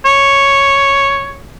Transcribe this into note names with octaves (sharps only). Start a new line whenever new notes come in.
C#5